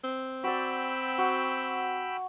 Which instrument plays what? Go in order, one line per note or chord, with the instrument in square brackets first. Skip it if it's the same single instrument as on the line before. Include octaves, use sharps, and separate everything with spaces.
[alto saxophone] C4
[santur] F#4 D5 [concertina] G5 B5 E6
[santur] F#4